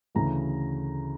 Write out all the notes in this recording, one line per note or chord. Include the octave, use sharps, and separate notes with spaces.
D2 C#3 E3 A3 A#5